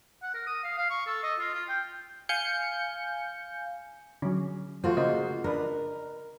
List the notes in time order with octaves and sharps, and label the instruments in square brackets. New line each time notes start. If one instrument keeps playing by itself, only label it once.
[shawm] F#5
A#4
D#6
F5
F5
C#6
A4
D#5
F4
F4
G5
[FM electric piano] F5 G#5 G6 C#7
[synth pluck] D3 F#3 [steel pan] C#4
[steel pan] F3 A3 C5 [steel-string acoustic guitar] F4 F#4
[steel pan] C#3 A#3 C5 [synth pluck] D#5
[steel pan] D4 B4 [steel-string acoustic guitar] A#4